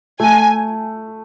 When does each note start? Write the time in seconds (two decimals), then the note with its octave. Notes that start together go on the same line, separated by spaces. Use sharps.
0.20 A3 G#5